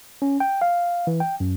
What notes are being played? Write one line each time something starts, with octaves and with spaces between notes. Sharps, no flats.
C#4
G5
F5
E3
G5
F#2